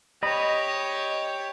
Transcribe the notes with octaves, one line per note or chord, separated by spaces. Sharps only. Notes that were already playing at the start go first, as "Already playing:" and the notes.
G4 C#5 D#5 B5